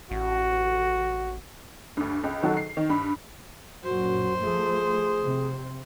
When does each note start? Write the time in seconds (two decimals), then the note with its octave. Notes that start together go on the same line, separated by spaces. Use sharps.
0.11 A1 F#4
1.97 D2 G2
2.24 C#2
2.43 D#3 F#3 F#4 A4
2.57 C7
2.77 D#3
2.90 G2 B5
3.84 F#2 A#2 F#4 C5
4.43 F3 A3 G#4
5.25 C3